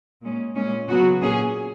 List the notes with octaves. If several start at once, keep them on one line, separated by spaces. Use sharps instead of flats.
A#2 G#3 C#4
A#2 G#3 C#4
C#3 F#3 B3 F#4
A#2 A#3 C#4 G#4